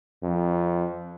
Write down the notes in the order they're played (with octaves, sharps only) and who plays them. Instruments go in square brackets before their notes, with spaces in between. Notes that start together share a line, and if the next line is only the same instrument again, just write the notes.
[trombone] F2